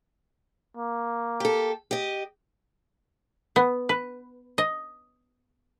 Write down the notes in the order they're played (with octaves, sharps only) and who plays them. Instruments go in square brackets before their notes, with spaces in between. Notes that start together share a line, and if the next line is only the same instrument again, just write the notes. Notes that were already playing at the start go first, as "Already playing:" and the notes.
[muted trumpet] A#3
[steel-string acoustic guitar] G4 A4
G4 D#5
[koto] B3
B4
D#5